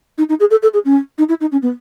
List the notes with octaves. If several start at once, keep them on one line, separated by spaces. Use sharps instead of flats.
D#4
D#4
G#4
A4
A4
G#4
C#4
D#4
E4
D#4
C#4
B3